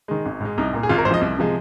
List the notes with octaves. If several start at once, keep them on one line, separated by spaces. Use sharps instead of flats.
D#3 G#3
G#1
G#2 G#3
C2 D#4
A#2 A#3
G#4
G#1 F4
A#4
G#2 C5
F3 D#5
C2
C3 F3 G#3